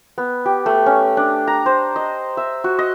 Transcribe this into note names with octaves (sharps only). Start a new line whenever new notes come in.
B3
G4
A3
C#4
D4
A#5
C5
D#5
E5
F#4
D#5